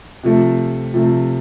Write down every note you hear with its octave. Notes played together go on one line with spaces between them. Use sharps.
C3 F3 A3
C3 F3 A3